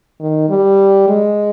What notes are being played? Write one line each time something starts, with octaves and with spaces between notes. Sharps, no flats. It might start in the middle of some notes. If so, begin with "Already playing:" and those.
D#3
G3
G#3